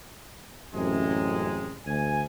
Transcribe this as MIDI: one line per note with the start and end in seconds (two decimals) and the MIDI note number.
0.74 1.75 33
0.74 1.75 42
0.74 1.75 48
0.74 1.75 56
1.85 2.22 38
1.85 2.22 80